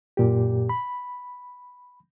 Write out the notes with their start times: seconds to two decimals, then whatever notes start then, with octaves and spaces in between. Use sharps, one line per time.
0.17 F#2 A#2 G4
0.69 B5